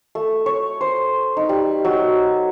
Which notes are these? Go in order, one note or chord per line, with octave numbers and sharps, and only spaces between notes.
A3
C#5
C5
D#4
G3
F#3